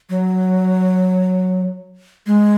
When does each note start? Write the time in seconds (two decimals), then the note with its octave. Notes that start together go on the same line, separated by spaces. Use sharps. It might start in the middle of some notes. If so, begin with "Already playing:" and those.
0.10 F#3
2.26 G#3